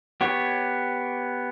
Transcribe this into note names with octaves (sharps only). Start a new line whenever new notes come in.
B3 G4 C#5